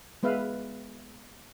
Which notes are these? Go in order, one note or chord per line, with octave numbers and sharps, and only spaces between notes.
G#3 B3 B4 E5 F5